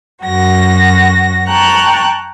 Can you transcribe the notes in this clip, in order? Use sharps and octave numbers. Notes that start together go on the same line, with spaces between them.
F#2 F#4 A#6
G5 A5 A#5 C#6 F#6